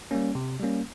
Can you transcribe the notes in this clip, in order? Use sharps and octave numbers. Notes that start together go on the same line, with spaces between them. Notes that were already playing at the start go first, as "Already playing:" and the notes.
G3 A#3 C#4
C3
G3 A#3 C#4